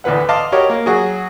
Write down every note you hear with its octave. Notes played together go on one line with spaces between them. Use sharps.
D2 A2 E3 B4 F#5
D#5 F5 A5 C6 D6
F#4 G4 A#4 C#5 D#5
A#3
F#3 F#4 G#4